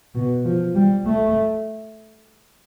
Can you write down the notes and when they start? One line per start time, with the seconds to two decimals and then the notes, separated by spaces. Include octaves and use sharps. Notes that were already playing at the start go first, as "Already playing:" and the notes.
0.15 B2
0.45 F3
0.75 G3
1.06 A3